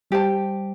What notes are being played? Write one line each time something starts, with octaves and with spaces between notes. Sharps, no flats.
G3 G4 C5 A5